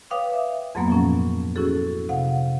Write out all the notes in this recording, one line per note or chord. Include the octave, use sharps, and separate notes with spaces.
B4 C#5 F5 G5 D6 D#6
E5
F2 G#2 F#3 A#3 B3
A#2 F3 C#4
C#4 E4 F#4 G#4 A4
C3 F5 F#5